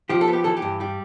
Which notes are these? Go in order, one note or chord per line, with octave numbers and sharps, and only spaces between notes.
F3 G4
A4
B3
G4
E3 A4
G4
G2
G3 G4